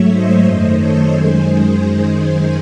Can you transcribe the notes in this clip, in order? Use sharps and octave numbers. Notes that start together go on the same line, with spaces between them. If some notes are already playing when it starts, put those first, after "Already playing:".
Already playing: G#2 F#3 A3 C#5 E5
C5 D#5
F#2 D#3 A3
A4 C#5
F#2 D#3 G#3 G#4 C5